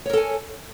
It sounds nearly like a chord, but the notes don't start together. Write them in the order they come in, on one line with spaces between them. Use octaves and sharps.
C#5 A#4 A4 G#5